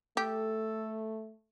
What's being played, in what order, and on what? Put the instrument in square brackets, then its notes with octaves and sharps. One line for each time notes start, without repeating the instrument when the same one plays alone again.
[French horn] A3 [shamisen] G4 [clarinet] A4